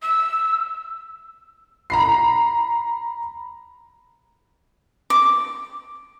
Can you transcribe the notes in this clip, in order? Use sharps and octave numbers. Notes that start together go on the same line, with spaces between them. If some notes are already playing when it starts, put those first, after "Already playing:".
E6
A#5 B5 C7
D6